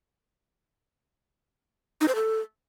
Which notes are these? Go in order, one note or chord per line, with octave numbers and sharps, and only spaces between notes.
D#4
C5
A4